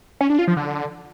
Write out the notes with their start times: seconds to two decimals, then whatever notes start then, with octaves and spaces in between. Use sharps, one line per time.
0.21 C#4
0.30 D4
0.39 F4
0.48 F3
0.57 D3